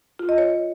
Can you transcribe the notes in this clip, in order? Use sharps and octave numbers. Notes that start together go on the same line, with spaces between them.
F4
D#5
C#5